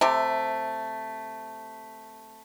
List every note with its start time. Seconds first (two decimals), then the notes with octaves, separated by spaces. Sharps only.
0.01 C3 A3 G4